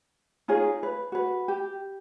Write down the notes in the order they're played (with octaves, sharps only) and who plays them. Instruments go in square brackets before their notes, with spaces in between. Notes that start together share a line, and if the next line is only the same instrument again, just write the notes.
[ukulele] D#4 F4 G#4 C#5
B4
F#4 B4
G4